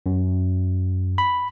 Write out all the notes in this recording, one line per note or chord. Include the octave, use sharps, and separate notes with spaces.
F#2
B5